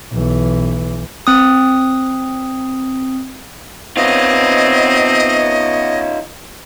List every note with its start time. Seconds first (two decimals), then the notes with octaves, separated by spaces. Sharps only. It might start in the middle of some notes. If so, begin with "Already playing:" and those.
0.12 B1 E3
1.27 C4 D#6
3.97 B3 C4 D#4 F4 C#5 D#5